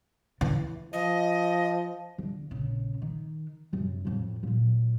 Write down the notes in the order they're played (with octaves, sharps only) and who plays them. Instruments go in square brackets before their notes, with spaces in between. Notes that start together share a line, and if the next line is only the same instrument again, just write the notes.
[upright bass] E3
[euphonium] F3 [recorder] D#5
[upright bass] D3
A#1 C#3
D#3
F#2 C3
F2 A2
A#2 F#3